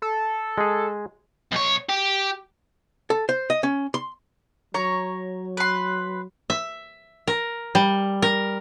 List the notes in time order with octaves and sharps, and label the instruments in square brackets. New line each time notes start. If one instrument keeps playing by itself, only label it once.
[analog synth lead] A4
[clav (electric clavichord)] G#3 G#4
[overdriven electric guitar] B1 C#5
G4
[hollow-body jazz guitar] A4
C5
D#5
C#4
C6
[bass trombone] F#3 [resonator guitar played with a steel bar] C#5 [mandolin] A#5
[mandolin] B4 C6
[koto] E5
A#4
G3
A#4